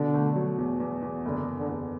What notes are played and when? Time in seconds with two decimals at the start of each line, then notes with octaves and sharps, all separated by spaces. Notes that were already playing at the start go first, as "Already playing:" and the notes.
Already playing: B2 D3
0.14 A3
0.36 F#3
0.58 E2
0.80 E2
1.02 E2
1.25 F#1 D3
1.47 F#1
1.58 D3
1.69 E2